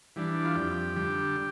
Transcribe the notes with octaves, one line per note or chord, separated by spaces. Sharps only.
E3 G3 D4
F4
F2 G4
D3 G3